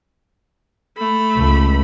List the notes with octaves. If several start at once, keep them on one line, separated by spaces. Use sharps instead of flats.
A3 B5
C#2